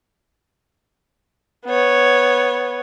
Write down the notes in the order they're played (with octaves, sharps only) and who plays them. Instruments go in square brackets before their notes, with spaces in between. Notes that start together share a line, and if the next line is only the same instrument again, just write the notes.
[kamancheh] B3 C#5